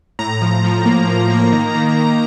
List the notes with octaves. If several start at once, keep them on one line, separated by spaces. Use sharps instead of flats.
A2 A#5
F3
F3
A#3
A#3
A#3
D#3
D#3
D#3